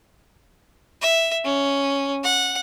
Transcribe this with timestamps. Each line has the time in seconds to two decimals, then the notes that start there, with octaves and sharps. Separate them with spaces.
1.02 E5
1.45 C#4
2.24 F#5